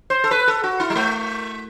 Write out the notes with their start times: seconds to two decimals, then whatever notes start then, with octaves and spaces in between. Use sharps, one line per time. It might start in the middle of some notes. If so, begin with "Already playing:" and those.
0.10 C5
0.24 A4
0.31 B4
0.48 A4
0.64 F#4
0.80 E4
0.90 G3
0.95 A3